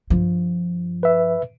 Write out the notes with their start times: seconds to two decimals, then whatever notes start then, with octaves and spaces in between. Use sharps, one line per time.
0.10 G2 F3
1.03 B4 E5